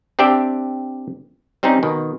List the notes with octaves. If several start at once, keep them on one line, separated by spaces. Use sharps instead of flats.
C4 D4 G4 D5 E5 G5
G3 C4 C#4 D#4
B2 D#3